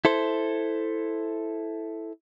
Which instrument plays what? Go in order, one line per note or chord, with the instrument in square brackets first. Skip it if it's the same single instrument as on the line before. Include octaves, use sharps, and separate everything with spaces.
[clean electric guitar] E4 A4 C5